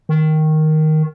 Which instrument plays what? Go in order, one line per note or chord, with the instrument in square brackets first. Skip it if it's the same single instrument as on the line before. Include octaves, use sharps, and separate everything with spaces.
[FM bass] D#3